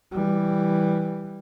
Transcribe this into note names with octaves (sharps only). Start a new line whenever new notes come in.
E3 G3